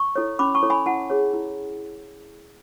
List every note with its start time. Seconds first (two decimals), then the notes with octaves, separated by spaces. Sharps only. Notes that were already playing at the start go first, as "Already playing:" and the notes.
Already playing: C#6
0.16 E4 A4 C#5
0.39 C#4 B5 D6
0.55 A5 C#6
0.63 E4 A4 C#5
0.70 G#5 B5
0.86 E4 F#5 A5
1.10 G#4 C#5
1.34 E4